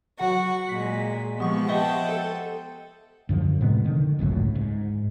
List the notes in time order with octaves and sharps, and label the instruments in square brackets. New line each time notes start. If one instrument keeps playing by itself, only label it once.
[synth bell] F#3 F#5 [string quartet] F#4
[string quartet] A#2 G#3 [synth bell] B6
[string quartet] C3 F3 [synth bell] G#3 B3 C#6
[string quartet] C5 G5 A5 [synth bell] D#5 E5 F#5
[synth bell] A4
[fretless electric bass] F#2 D3 F3
A2 C3 G#3 B3
D3 D#3
G#1 C#2 F#2 A2
G#2